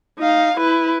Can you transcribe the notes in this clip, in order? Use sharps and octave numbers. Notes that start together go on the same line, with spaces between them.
D#4 F5
E4 B4